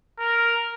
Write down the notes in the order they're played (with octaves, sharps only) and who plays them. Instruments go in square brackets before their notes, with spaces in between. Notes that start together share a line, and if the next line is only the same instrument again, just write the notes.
[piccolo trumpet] A#4